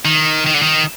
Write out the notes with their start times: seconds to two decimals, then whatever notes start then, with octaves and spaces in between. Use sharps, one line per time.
0.05 D#3
0.46 D#3
0.54 D3
0.62 D#3